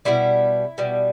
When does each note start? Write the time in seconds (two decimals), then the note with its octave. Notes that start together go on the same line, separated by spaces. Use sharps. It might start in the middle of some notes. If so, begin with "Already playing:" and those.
0.05 B2 G3 E4
0.78 B2 G3